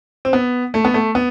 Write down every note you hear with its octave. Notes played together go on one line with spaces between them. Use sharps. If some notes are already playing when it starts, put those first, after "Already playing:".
C4
B3
A3
B3
A3
B3